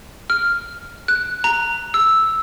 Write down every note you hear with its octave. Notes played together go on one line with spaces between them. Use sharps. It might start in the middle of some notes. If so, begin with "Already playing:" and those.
F6
F#6
A#5
E6